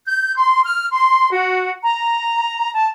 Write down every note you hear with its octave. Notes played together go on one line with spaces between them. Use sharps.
G6
C6
F6
C6
F#4
A#5
A5